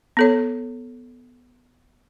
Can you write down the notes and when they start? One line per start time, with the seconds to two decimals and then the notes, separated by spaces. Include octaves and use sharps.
0.17 B3 A4 C#5